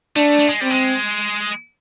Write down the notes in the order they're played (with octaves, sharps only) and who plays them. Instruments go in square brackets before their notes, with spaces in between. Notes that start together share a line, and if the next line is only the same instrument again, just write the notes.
[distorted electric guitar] A3 [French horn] D4
[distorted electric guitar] A3
G#3
[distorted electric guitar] G3 [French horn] C4
[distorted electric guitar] G#3